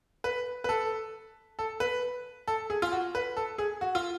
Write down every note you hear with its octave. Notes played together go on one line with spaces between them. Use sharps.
B4
B4
A4
A4
B4
A4
G#4
F4
F#4
B4
A4
G#4
F#4
F4